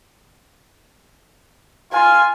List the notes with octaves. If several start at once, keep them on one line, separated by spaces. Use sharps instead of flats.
F4 G#5